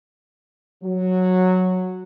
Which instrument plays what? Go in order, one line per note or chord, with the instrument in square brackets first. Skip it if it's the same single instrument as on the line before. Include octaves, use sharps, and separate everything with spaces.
[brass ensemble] F#3